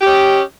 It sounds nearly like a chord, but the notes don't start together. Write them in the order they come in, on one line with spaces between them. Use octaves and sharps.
G4 C#4 D#5